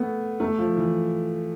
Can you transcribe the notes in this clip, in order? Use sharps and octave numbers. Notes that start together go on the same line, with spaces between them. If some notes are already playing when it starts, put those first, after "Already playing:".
Already playing: A3 B3
A3
F3
E3